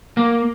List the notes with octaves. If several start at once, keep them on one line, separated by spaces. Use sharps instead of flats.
A#3